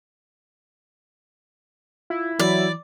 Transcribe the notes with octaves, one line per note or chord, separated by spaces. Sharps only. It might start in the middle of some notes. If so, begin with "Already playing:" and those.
E4 F4
E3 F#3 D5